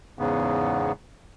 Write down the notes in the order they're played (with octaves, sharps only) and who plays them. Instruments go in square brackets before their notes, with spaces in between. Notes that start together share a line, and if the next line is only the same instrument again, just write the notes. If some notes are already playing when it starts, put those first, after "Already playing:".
[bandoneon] E2 G#2 C#3 B3